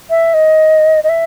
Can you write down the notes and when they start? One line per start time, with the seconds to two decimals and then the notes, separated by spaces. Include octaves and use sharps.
0.10 E5
0.34 D#5
1.04 D#5
1.09 E5